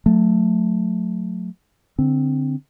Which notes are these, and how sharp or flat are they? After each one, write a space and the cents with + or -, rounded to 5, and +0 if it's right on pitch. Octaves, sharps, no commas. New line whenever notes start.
F#3 -25 A3 +0
D3 +0 C4 +0